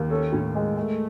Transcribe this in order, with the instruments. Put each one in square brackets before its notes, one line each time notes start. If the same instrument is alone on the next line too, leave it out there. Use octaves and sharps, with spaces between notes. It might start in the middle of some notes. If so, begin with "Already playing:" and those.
Already playing: [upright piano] D#2
[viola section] C#4 [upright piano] A4
[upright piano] A2
G#3
[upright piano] G#3 [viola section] A3